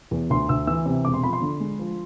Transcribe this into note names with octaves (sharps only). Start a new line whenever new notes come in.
E2
D2 C6
D2 E6
E3 E6
C3
E1 D6
C6
F3 B5
C6
D3
G#3
F3